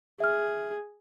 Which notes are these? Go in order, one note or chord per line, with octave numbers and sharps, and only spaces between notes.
G#4 E5 F6